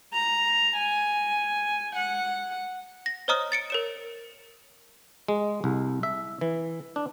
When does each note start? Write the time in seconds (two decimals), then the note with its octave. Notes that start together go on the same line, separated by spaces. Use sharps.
0.13 A#5
0.77 G#5
1.96 F#5
3.06 A#6
3.28 C5 C#5 D#5 A#5 D#6 F6
3.52 A6 C#7 D7
3.70 A#4 C#5 E7
5.28 G#3
5.64 C2
6.03 E5
6.41 E3
6.96 D4